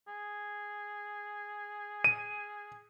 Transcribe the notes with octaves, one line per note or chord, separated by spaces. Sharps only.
G#4
D#7